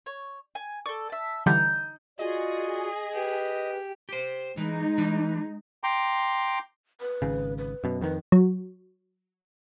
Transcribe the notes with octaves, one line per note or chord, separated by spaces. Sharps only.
C#5
G#5
A4 D5 C#6
E5 A5
D3 E3 G3 D#4 A#5 G6
F4 F#4 G#4 D5 D#5
G4 B4
G4 C5
E3 G#3 D#4
E3
G5 A#5 C6 D6
B4
G#1 C#3
B4
F#2 B2
F2 D#3 B4
F#3